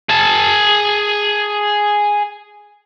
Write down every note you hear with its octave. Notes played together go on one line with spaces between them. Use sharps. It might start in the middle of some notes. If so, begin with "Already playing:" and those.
G#4 A5